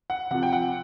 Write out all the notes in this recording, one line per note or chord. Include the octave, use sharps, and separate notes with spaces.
F#5
C3 F3 F#5
G5
F#5